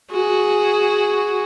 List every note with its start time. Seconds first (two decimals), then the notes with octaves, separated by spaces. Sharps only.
0.11 F#4 G#4